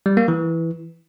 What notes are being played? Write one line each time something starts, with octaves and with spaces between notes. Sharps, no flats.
G3
A#3
E3